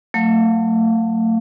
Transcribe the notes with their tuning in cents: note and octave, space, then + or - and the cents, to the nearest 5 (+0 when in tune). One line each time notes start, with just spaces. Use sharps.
F#3 -15 A3 +30 F5 +0